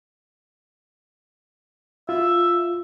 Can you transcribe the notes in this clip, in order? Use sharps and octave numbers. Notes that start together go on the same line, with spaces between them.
F4 E5